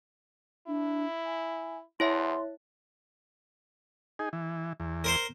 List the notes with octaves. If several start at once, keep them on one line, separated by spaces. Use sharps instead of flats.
D4 E4
G#5
E2 E4 C#5 E5 C6
D#4 G#4
E3
E2
A#4 C5 C6